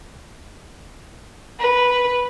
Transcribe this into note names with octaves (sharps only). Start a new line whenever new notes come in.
B4